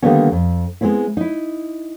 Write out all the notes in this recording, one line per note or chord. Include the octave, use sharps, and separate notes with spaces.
D3 D#3 G3 A#3 B3 C#4
F2
G#3 A3 B3 C4 E4
D#4 E4